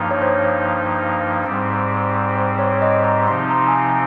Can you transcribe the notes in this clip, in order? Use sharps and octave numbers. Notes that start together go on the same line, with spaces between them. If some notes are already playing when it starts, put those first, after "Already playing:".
Already playing: G2 F3 A#3 D#4
C#5
C5
G#2 G3 C4
C5
C#5
D#5
A#5
C3 F3 C4 D#4 C6
A#5
G#5
A#5